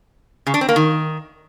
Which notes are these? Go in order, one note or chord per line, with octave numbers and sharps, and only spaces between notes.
C#3
D4
C4
A#3
D#3